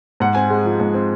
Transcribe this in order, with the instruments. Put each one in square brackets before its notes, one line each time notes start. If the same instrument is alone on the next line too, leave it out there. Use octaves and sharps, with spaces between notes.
[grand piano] G#2 F#5
C4 G#5
G#3 F#5
F3
G#2
C4